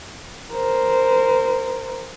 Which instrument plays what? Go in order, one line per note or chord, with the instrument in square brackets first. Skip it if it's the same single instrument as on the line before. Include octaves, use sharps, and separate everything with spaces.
[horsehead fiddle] A#4 C5